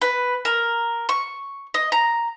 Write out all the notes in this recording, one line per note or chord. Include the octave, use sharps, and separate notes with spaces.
B4
A#4
C#6
D#5
A#5